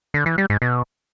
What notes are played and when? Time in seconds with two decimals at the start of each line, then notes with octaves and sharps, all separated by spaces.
0.14 D3
0.26 E3
0.38 G3
0.50 G#2
0.62 B2